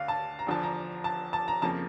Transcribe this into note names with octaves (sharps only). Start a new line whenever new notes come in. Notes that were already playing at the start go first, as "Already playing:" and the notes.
Already playing: D2 D3 F5
A5
A#5
E2 D3 F3 A5
A#5
A5
A5
A#5
F2 C#3 F3 A#3 A5